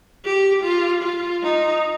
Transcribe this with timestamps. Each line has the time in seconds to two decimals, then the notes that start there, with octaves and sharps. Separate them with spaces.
0.25 G4
0.64 F4
1.03 F4
1.43 D#4